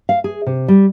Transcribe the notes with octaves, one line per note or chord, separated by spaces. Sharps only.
F5
G#4
C3
G3